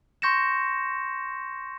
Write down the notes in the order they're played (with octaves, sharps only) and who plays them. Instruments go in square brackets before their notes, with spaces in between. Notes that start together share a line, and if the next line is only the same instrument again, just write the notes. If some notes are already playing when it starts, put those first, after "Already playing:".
[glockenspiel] C6 C#6 G6 A#6 C#7 E7